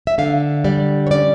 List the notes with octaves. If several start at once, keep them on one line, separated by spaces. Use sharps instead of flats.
E5
D3 F5
G3 D5
C#5
C#4 D5